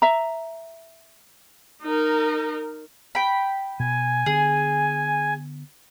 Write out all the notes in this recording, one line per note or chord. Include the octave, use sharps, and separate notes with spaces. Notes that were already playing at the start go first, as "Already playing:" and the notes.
E5 A#5
D#4 A#4
G5 B5
B2 G#5
D3 B3 G#4